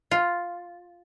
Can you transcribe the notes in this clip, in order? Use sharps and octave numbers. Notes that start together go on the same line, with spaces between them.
F4